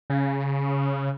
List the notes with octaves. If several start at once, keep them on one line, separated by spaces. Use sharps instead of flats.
C#3